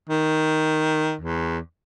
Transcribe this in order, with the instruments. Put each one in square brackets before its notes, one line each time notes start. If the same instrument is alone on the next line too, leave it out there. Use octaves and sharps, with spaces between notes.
[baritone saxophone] D#3
E2